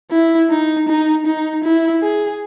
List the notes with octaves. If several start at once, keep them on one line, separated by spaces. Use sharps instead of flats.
E4
D#4
D#4
D#4
E4
G#4